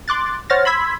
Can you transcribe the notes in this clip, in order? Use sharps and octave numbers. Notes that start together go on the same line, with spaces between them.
C6 D6 F#6 A6
C5 C#5 F#5 F6 A6 A#6
B5 C6 E6 G#6 B6